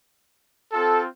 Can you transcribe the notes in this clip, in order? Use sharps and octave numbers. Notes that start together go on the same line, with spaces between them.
C4 F4 A4